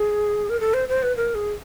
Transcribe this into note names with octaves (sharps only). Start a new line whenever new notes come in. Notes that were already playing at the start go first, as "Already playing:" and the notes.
Already playing: G#4
A#4
A4
C5
C5
B4
A#4
G#4